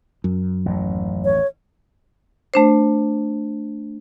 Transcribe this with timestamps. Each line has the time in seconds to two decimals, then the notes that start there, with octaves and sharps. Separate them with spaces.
0.24 F#2
0.66 A1 D#2
1.25 C#5
2.54 A3 D4 C5